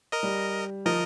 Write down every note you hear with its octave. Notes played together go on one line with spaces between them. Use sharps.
A#4 D#5
G3
F3 A#4 D#5